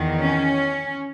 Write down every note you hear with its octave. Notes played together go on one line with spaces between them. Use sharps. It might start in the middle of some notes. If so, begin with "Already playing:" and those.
Already playing: E2 D#3
C#4